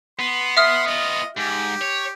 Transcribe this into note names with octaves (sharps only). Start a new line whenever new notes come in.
B3 C6
E5 C6 D#6 F6
B3 F4 D#5
G#2 G4
C#5